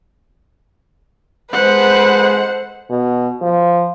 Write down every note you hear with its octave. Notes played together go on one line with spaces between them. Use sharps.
G#3 A4 B4 C5 F#5
B2
F3